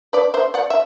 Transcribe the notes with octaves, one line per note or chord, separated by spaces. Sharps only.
B4 D5
C5 E5
D5 F#5
E5